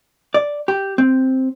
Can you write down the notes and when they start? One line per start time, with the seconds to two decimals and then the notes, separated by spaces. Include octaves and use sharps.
0.34 D5
0.68 G4
0.98 C4